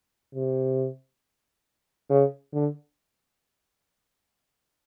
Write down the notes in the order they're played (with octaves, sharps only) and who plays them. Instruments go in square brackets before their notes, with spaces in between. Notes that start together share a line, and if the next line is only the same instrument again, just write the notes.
[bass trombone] C3
C#3
D3